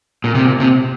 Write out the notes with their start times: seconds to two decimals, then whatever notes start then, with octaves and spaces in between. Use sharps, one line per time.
0.24 A#2
0.35 C3
0.46 A#2
0.60 C3